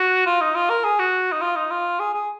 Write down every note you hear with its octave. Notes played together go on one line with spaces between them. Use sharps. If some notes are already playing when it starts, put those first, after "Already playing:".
Already playing: F#4
F4
D#4
F4
A#4
G#4
F#4
D#4
F4
D#4
F4
G#4
G#4